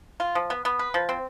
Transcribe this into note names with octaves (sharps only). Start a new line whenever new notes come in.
F4
F3
B3
B3
B4
F3
C4